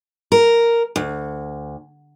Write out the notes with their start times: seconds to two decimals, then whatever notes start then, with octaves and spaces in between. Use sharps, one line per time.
0.32 A#4
0.96 D2